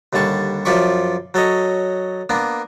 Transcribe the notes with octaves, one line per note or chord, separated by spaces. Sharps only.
D#2 D3 G3 A5 C#6
F#2 F3 F4 D5 B5 C#6
F#3 A4 C#5 D#5
A#3 B3 D4